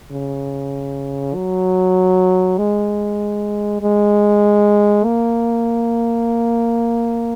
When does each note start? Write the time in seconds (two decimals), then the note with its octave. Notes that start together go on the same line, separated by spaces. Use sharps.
0.12 C#3
1.35 F#3
2.58 G#3
3.82 G#3
5.04 A#3